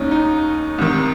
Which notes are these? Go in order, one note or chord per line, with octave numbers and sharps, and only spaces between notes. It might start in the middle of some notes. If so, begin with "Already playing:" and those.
Already playing: D#2 D#3 C#4 D#4
D#4
C2 C3 D#3